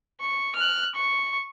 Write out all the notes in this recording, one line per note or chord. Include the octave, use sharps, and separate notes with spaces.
C#6
F6 F#6
C#6